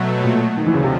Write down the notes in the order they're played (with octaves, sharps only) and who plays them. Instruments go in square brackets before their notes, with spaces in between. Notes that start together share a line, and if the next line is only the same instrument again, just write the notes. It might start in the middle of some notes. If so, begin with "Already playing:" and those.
Already playing: [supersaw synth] B2 F#3 A3
[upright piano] A#2
[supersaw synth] D#2 D3 F3 [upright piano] D#3
[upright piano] E3
C#3
C3